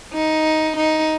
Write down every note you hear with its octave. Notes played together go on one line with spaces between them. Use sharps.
D#4
D#4